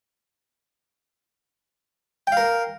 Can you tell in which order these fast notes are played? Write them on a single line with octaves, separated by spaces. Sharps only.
G5 F5 A#4